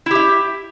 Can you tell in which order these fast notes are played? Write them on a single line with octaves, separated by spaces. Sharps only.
E4 G4 E5